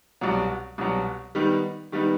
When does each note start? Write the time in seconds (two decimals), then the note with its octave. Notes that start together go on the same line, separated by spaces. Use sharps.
0.21 C2 B2 F#3
0.78 C2 B2 F#3
1.35 D#3 G3 B3 D#4
1.92 D#3 G3 B3 D#4